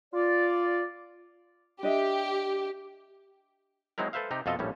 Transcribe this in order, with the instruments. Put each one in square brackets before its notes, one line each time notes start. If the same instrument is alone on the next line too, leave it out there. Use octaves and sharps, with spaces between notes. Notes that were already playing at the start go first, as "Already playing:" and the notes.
[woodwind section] F4 D5
[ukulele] D4 D#5 E5 [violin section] G4
[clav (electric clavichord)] F#3 G#3 C4 D#4 E4 A#4
A4 B4 C5 E5 F5
C3 D#4 G4
F2 B2 F4 A4 D#5 E5
A#1 A2 G3 C#4